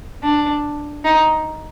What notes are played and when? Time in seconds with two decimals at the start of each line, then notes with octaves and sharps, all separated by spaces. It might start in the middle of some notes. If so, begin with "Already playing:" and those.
0.23 D4
1.04 D#4